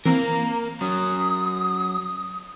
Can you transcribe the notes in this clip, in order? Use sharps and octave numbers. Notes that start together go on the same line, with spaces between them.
E3 A#3 C4 A#4 A#5
F#3 C#4 D#6